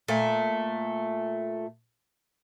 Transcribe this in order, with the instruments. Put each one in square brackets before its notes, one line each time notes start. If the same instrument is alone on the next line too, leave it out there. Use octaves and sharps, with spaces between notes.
[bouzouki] A#2 A3